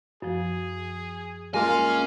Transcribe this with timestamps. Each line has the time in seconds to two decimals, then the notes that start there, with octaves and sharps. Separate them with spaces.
0.22 F#2 F3 G#4
1.54 G#3 A#3 C#4 F4 F5 G#5